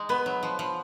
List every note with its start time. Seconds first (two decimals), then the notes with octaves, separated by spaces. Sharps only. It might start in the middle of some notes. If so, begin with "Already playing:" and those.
Already playing: G#3 D#4
0.09 B3 B4
0.26 F#3
0.43 F3
0.59 F3